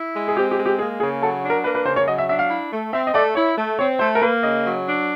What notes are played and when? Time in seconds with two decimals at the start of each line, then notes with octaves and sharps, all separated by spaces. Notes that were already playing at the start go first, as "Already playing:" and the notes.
Already playing: E4
0.15 G#3
0.28 G#4
0.36 C4 G4
0.51 G4
0.58 G#3
0.66 G4
0.79 A#3 G#4
1.00 C#3 G#4
1.22 F#3 A4
1.44 D4
1.50 A#4
1.64 A#3 B4
1.75 B4
1.85 C#3 C5
1.96 C#5
2.07 F#3 D#5
2.18 E5
2.29 D4 E5
2.39 F5
2.50 E4
2.72 A3
2.93 C4 E5
3.07 D#5
3.14 A3 D5
3.35 E4 C#5
3.57 A3
3.79 C4 C#5
3.99 A3 C5
4.15 A#4
4.21 A#3 B4
4.43 C#3 D#5
4.64 F#3
4.86 D4